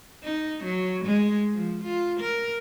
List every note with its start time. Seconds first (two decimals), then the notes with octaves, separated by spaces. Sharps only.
0.24 D#4
0.64 F#3
1.05 G#3
1.53 F3
1.83 F4
2.20 A#4